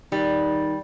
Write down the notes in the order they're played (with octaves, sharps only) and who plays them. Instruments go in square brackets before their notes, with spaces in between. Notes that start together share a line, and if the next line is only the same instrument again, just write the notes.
[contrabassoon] D#3 [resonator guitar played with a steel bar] G3